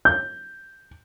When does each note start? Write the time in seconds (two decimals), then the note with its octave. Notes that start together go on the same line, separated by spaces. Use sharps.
0.05 G6